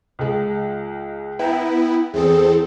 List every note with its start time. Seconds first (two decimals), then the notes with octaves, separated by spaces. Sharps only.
0.19 C#2 G#3
1.39 B3 E4 G5 A#5
2.14 E2 C4 G#4 A4